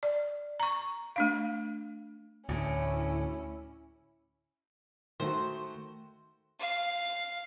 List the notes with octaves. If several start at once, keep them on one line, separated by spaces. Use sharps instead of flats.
D5
A#5 C#6
A3 D4 F5
D2 A2 C#4 E4
D#3 A3 F#4 C5
F5